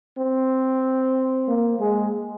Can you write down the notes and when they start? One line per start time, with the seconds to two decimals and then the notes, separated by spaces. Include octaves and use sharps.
0.16 C4
1.46 A#3
1.79 G#3